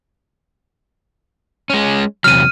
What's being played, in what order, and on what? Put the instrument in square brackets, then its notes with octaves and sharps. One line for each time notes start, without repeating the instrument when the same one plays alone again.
[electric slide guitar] G#3 C#4
[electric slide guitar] E2 C3 F#3 [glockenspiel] F6 D#7